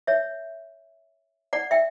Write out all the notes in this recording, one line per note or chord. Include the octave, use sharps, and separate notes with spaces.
C#5 E5
D5 F#5
E5 G5